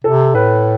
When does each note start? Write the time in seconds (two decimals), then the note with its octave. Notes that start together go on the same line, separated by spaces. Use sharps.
0.04 C3 A4
0.35 A2 B4